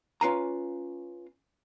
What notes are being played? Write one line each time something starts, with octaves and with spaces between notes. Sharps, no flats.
C#4 F4 B4 F5 G#5 A#5